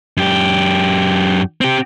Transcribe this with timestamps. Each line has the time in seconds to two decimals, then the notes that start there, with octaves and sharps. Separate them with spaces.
0.17 F#2 G4
1.61 C4 G4